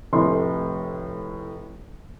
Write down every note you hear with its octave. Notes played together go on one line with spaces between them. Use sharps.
F1 A2 C6